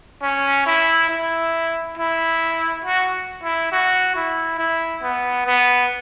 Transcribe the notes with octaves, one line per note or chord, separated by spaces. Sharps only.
C#4
E4
E4
E4
F#4
E4
F#4
E4
E4
B3
B3